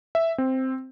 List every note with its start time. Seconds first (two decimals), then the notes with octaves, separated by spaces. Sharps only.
0.15 E5
0.38 C4